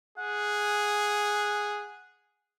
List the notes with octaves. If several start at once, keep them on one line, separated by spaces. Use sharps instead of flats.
G#4 F#5